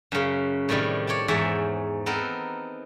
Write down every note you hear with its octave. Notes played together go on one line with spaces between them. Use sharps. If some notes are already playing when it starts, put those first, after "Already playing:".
F#2 C#3
A2 C3 D#3 G3
C#5 D5 G5 A5
E2 G#2 C5 C#5 E5 A5
B3 C4 D#4 A4 A#4